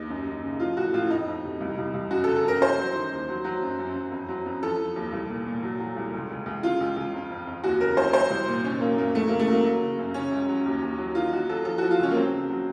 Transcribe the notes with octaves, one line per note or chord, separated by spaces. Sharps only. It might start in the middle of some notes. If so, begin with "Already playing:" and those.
Already playing: D#2 D#4
F#2
F#2
C#3
F3 F4
A2 F#4
A2 F4
F2 D#4
F2
C3
C2
C2
C2
F#2 F#4
A4
C#3
A4
F#2 A#4
F#2 C5
F#3
D#3
D#2
F#3
F#3
F#2
F#2
F#2
F2
F#3
F2
F3 A4
F3
D#2
C2
A#2
A#2
F#3
F#3
C2
C#2
C#2
C#2
C#3 F4
C#2
C#2
F2
F2
F2
D#2 F#4
C#3 A#4
F#3 C5
F#3 C5
C2
A#2
D#3 C#4
F#3 A#3
F#2 A#3
F#3 A3
C#3 A#3
A3
F#3 A#3
F#3
C#3
F#2
C#3 C#4
C#2
F#3
D#2
D#2
F#3
D#3 F4
F#3 F#4
F#3 A4
F3 A4
F3 F#4
F4
C#2 C#4
A#3
F#3 C4
C#3
F#3